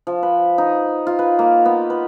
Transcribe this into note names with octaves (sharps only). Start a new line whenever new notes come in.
F3
B4
D#4
F4
B4
A#3
B3
B4